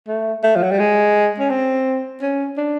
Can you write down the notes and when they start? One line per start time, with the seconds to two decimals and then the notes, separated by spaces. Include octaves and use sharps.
0.08 A3
0.44 A3
0.57 F3
0.63 F#3
0.71 G3
0.79 G#3
1.39 C#4
1.50 C4
2.22 C#4
2.58 D4